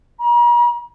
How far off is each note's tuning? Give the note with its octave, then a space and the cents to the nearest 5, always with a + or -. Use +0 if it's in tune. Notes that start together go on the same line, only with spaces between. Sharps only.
A#5 +45